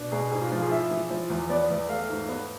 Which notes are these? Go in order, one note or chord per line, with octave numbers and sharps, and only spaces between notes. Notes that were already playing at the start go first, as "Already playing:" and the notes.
Already playing: B2 D4
B2 G#4
G#2 G#4
F4
F3 F4
G#4
E4 E5
E3
F3
E2
B3 D5
E2
A3 F5
G#2
B3